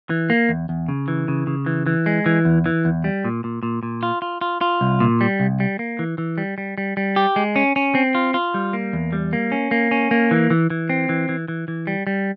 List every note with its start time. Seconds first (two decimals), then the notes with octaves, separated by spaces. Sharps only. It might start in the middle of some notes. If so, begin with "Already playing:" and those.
0.10 E3
0.30 A#3
0.49 E2
0.69 E2
0.88 C#3
1.08 E3
1.28 C#3
1.47 C#3
1.66 E3
1.87 E3
2.06 G#3
2.26 E3
2.45 E2
2.66 E3
2.85 E2
3.04 G3
3.25 A#2
3.44 A#2
3.63 A#2
3.83 A#2
4.03 F4
4.22 F4
4.41 F4
4.61 F4
4.81 C2
5.00 A#2
5.21 G3
5.40 C2
5.60 G3
5.79 A#3
5.99 E3
6.18 E3
6.38 G3
6.58 G3
6.78 G3
6.97 G3
7.16 G4
7.36 G#3
7.56 C#4
7.76 C#4
7.95 C4
8.15 F4
8.34 F4
8.54 G3
8.73 A#3
8.93 E2
9.13 G3
9.33 A#3
9.52 C#4
9.71 A#3
9.91 C#4
10.11 A#3
10.31 E3
10.50 E3
10.70 E3
10.90 C4
11.09 E3
11.29 E3
11.48 E3
11.68 E3
11.87 G3
12.07 G3